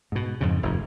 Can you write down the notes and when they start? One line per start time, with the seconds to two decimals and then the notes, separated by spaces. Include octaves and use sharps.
0.12 G#2 B2
0.41 F2 G#2 C#3
0.63 F1 D#2 G#2